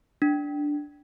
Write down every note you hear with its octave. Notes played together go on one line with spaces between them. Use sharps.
D4